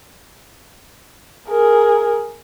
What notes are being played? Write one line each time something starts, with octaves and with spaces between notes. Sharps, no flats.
G#4 A#4